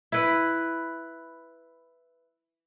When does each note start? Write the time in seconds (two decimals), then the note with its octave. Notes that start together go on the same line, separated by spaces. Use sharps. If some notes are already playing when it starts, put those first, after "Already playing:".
0.12 E4 B4